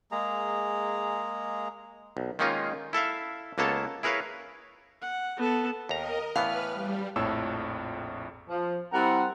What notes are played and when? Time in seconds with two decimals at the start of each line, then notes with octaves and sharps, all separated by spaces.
0.11 G#3 A#3 G#4 A#5
2.17 B1
2.39 D#3 G#3 A#3 C#4 D#4 F4
2.93 E4 A4 E5 F5
3.58 C#2 A#3 B3 A4 C#5 A5
4.03 E4 G#4 A#4 B4 C#5 F5
5.01 F#5
5.37 B3 A4
5.89 D#2 A#4 D#5 A#5
6.36 A2 E3 B3 B4 F5 F6
6.72 G3
7.16 A#1 F2 A2 A4 C#5 E6
8.49 F3
8.92 G3 C4 E4 A#4 F#5